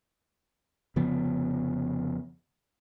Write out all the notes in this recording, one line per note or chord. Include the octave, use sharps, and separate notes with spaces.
F1 C#3 F3 B3